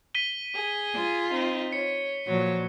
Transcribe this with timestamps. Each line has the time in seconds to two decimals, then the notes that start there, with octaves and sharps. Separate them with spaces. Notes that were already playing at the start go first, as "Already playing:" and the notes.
0.15 B6 D#7 G7
0.54 G#4
0.94 F4
1.32 C4 D#4
1.72 C#5 C#7
2.27 A#2 F3 F#3 C#5